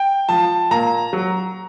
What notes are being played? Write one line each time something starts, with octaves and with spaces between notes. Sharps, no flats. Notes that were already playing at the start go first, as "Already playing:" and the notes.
Already playing: G5
F3 A5
A#2 A#5
F#3